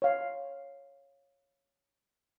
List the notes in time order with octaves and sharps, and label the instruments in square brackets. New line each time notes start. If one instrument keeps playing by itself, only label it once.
[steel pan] C#5 F5